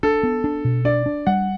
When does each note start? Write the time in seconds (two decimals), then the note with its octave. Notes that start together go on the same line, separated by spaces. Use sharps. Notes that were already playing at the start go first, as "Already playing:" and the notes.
0.03 D4 A4
0.23 B3
0.44 D4
0.65 B2
0.85 D4 D5
1.06 D4
1.27 G3 F#5